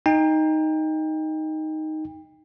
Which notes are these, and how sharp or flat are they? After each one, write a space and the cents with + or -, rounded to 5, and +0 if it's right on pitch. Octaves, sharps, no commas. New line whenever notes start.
D#4 +0 G5 +30